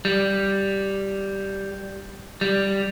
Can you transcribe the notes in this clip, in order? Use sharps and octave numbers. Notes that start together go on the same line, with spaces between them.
G3
G3